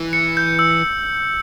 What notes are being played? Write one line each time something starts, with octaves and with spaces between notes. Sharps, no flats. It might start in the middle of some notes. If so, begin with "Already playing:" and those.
Already playing: E3
C#7
G6
E6